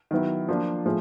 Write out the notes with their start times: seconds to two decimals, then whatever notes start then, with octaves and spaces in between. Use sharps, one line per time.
0.11 D#3 F#3 B3 E4
0.49 F3 A#3 D4 F4
0.86 A2 F3 G#3